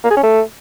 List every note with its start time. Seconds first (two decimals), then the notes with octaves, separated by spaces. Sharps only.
0.04 A#3
0.11 G#4
0.17 C#4
0.23 A3